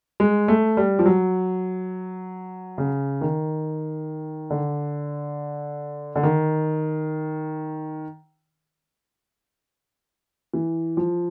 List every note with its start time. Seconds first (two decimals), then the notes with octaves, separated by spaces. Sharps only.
0.20 G#3
0.48 A3
0.77 G3
0.99 F3
1.06 F#3
2.78 C#3
3.21 D#3
4.50 D3
6.16 D3
6.23 D#3
10.54 E3
10.97 F3